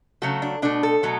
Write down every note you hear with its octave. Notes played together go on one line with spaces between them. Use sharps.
C#3 F#3 A3 F#4
D4
B2 A3 D4
A4
B2 F#3 A3